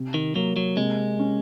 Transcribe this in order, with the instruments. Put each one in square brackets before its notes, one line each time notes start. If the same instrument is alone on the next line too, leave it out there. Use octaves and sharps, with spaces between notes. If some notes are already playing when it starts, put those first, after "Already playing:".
Already playing: [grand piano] C3
[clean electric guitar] D#3
[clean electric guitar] F#3 [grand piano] A#3
[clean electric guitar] F#3
[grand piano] C3 [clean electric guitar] G#3
[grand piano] C#4